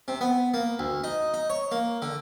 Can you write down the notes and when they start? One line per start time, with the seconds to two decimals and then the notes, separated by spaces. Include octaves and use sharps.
0.08 C3
0.21 B3
0.54 A#3
0.79 D2
1.04 D#4
1.34 D#4
1.50 C#5
1.72 A#3
2.02 D3